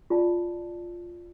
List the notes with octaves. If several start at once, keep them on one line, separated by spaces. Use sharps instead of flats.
F4 D5 A5